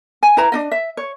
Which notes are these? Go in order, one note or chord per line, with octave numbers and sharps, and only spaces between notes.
G#5
E4 B4 A#5
D4 D#4 D#5
E5
C#5